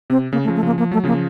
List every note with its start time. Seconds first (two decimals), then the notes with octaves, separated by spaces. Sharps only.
0.10 C3 C4
0.32 C#3 A#3
0.44 A3
0.47 C#3 F3
0.56 A3
0.63 C#3 F3 A#3
0.78 F3 A#3
0.92 F#3 A3
1.04 C#3 F3 A#3